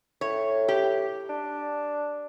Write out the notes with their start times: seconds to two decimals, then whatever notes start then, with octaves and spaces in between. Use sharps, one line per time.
0.21 A2 C#5
0.68 G4
1.29 D4